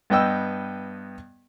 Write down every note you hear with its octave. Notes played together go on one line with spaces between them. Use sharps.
G2 B3 D#5 G5 E6